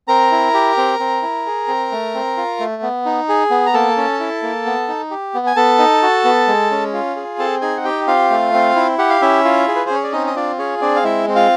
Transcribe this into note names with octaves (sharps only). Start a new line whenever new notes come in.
C4 A#4 A#5
E4
G4
C4
C4
E4
G#4
C4
A3
C4
F4
A3
B3
D#4
G#4
B3
A#5
A#3 A4 A5
C#4
E4
A#3
B3
D#4
G4
B3
G#5
B3 A4 A5
D#4
F#4
B3
G#3
C#4
F4
G#4
C4 A4 A5
D#4 G#4 G#5
F#5
G4 G5
C4 F4 F5
A3
C4
E4
G4 F#5
F5
C#4 E4 E5
F4
G#4
B4
C5
C#4 C#5
D5
C4 D#4 D#5
D#5
D4 F4 D5
C#4 G#4 C#5
C4 D4 D5
F5
G#3 E4 E5
C4
F4 F5